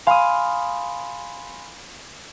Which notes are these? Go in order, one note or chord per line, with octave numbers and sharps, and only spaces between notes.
F5 G#5 B5 C6 D#6